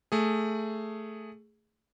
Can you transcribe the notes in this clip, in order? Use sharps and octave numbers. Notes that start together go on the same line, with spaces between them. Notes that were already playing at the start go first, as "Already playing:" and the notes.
A3 G#4